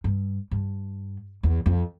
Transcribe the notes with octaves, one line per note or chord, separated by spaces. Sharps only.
G2
G2
E2
F2